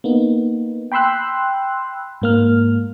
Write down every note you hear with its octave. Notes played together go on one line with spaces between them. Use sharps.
A#3 B3 D#4
G5 B5 C6 E6 F#6
G#2 A#3 F6